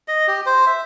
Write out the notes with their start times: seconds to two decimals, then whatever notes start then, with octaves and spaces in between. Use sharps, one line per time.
0.08 D#5
0.28 G4
0.46 C5
0.67 E5